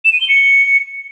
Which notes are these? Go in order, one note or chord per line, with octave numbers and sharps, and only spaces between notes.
E7
D#7
G7
C#7